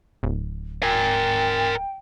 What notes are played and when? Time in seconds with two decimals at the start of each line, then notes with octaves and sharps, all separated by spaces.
0.23 D1
0.83 A#4 G5 G#5